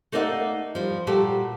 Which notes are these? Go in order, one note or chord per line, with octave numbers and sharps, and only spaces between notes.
A3 A#3 D#4 D5 E5 F#5
F3 G3
A#2 G3 F#4 G4 A4